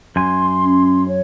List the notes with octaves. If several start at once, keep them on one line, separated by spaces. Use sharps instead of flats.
F#2 G#5 C6
C#4
C#5